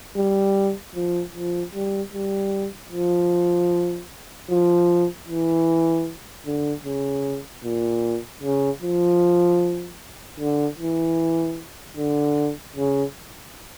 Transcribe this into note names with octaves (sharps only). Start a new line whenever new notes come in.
G3
F3
F3
G3
G3
F3
F3
E3
D3
C#3
A#2
C#3
F3
D3
E3
D3
C#3